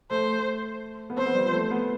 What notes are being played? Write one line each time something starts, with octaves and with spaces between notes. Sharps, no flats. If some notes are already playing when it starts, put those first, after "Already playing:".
A3 C5
B3
C4 C5
B3
G3
F3
A3
B3